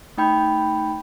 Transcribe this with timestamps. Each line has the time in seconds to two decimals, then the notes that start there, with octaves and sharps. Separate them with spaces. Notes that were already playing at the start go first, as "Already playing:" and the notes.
0.17 A3 D#4 G5 B5 G6